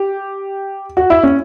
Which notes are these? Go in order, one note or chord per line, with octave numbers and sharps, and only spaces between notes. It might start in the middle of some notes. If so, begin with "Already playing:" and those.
Already playing: G4
F#4
E4
C#4